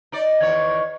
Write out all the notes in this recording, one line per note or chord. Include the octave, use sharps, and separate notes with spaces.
D#4 D5
E2 D#3 C#5